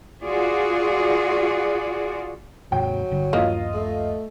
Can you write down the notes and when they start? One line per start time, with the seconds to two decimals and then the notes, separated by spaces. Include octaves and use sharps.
0.24 F4 F#4 G#4 D5
2.72 D#2 G#2 C3 F#3 G5
3.11 G1 D3 G3
3.33 D#1 G2 F3 A#3 F4 D#5
3.74 A3